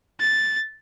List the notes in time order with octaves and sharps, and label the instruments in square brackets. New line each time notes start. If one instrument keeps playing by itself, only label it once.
[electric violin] A6